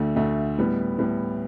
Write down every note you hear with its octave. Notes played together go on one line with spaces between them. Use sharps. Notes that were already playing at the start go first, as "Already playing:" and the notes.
Already playing: D2 D3 A3
D2 D3 A3
A2 G3 B3
A2 G3 B3